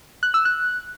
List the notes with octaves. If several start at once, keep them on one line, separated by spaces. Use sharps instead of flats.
F#6
E6
F#6